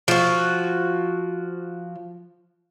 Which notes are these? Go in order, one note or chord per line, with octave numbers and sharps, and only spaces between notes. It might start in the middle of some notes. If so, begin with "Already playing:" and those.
F3 F#4